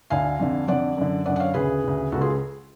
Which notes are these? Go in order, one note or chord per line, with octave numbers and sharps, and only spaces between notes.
D2 D3 F5 G#5
F2 D3
F2 D3 D5 F#5
F#2 D3
F#2 D3 D5 F#5
F#5
C#5 F5
D2 C#3 G#4 B4
D2 C#3
C#2 C#3 F#4 A4
F4 G#4